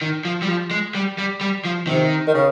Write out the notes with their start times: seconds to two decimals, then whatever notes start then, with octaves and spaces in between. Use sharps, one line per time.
0.01 D#3
0.25 F3
0.42 G3
0.48 F3
0.71 G#3
0.95 G3
1.18 G3
1.41 G3
1.65 F3
1.87 C3 D#3
2.27 D#3
2.34 C#3